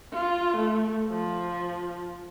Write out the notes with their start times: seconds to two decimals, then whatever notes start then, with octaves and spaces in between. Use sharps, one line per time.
0.13 F4
0.57 A3
1.08 F3